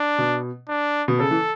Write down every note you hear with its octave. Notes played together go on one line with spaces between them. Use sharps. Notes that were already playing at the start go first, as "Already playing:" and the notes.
Already playing: D4
B2
D4
B2
C#3 A4
E3